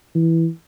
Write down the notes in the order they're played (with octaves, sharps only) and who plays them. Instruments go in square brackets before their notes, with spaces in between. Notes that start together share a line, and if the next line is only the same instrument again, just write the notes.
[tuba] E3